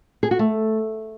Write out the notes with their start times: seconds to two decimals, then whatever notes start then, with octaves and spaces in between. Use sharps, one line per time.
0.23 G#4
0.31 F#4
0.39 A3